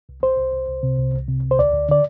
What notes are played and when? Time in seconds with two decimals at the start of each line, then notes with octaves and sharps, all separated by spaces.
0.09 C2
0.23 C2 C5
0.39 C2
0.54 C2
0.69 C2
0.83 C3
0.99 C2
1.14 C2
1.28 C3
1.43 C2
1.51 C5
1.59 D2 D5
1.74 D2
1.89 D3 D5